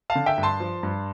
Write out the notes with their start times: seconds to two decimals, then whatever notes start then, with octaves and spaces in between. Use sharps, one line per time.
0.10 F5 A5
0.15 D3
0.26 E5 G5
0.38 G2
0.43 A5 C6
0.60 F3
0.83 G2